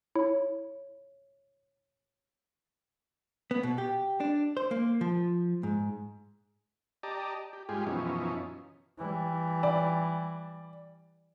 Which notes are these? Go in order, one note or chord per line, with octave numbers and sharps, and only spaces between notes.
E4 C#5
B3
B2
G4
D4
C5
A#3
F3
G#2
G4 D5 D#5 A5 A#5
G4
G#2 G3 G#3 F4 G4 G#4
F#2 B2 E3 F3 C#4 D#4
E3 G3
D5